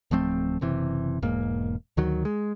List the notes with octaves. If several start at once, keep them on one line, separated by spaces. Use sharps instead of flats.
D1 F3 A3 C4
F#1 C3 E3
E1 G#2 A#3
D2 D#3 F#3
G#3